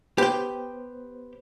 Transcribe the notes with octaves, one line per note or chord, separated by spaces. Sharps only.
B3 G4 B4 C5 G5